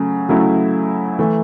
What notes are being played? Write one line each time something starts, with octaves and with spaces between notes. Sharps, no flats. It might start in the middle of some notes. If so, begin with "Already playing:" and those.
Already playing: C#3 F#3 A3
C#3 F#3 A3 E4
E3 A3